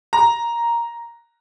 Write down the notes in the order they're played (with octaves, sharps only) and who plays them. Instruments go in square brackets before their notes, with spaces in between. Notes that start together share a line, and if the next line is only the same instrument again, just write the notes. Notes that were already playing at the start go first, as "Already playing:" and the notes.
[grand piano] A#5